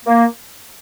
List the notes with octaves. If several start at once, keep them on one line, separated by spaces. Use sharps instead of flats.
A#3